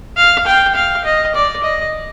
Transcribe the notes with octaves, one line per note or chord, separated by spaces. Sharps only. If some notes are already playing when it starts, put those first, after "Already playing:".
F5
G5
F5
D#5
D5
D#5